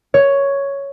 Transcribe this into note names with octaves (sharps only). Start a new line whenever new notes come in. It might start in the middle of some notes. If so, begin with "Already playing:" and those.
C#5